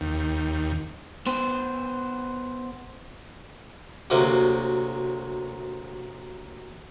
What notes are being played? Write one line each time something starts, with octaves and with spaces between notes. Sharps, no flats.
D#2
B3 C5
D2 C3 F#3 A#3 C4